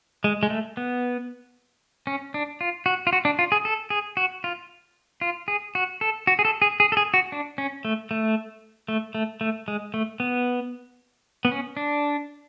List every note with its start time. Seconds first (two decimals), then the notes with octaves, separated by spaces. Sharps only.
0.24 G#3
0.43 G#3
0.50 A3
0.77 B3
2.07 C#4
2.34 D4
2.61 F4
2.86 F#4
3.07 F4
3.13 F#4
3.25 D4
3.39 F4
3.52 G#4
3.65 A4
3.90 G#4
4.17 F#4
4.44 F4
5.21 F4
5.48 G#4
5.75 F#4
6.01 A4
6.27 F#4
6.39 G#4
6.45 A4
6.62 G#4
6.80 G#4
6.92 A4
6.97 G#4
7.14 F#4
7.32 D4
7.58 C#4
7.85 A3
8.11 A3
8.88 A3
9.15 A3
9.41 A3
9.68 G#3
9.94 A3
10.20 B3
11.45 B3
11.52 C#4
11.77 D4